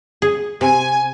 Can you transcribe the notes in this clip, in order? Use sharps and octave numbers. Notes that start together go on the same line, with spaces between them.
G#4
C3 G#5